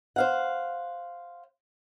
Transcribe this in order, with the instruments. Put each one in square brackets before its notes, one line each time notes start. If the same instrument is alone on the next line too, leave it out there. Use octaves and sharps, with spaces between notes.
[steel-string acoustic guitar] C5 F5 F#5